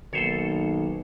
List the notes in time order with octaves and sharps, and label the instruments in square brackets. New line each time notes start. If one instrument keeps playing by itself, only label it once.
[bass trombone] B1 [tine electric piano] D#3 A#3 [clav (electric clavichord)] A4 C5 C#5